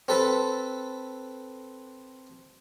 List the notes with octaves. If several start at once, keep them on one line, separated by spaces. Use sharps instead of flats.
C4 A4 B4